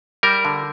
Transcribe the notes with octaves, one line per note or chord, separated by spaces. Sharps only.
G3 A#4
D3